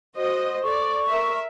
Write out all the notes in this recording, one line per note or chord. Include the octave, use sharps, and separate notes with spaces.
F#4 C5 D#5
A4 D5 C#6
A#4 E5